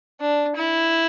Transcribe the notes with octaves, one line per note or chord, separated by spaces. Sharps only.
D4
E4